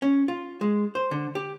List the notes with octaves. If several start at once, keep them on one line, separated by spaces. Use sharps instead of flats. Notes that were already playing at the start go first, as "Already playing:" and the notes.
C#4
F4
G#3
C5
D3
G4